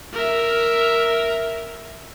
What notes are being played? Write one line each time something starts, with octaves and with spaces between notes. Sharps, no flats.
A#4 E5